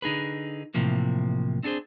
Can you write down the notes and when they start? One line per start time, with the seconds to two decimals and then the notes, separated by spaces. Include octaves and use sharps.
0.02 D3 D#4 G#4 B4
0.74 A2 C3 E3 F3 A#3
1.63 C4 D4 F#4 G#4 C5